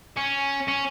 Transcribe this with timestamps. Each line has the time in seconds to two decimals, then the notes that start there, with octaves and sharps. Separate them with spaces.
0.17 C#4
0.68 C#4